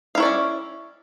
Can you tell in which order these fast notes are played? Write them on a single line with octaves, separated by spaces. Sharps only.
F5 E4 C#5 D5 C#4